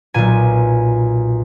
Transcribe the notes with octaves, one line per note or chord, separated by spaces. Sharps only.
B1 A#2 G#5